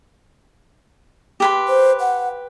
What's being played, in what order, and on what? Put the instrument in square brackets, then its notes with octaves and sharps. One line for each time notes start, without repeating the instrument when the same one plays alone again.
[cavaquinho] G4 B4 C6
[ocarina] C5
F#5